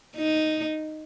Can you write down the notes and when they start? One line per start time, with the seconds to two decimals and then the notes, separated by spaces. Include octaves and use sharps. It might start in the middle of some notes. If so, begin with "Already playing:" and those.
0.16 D#4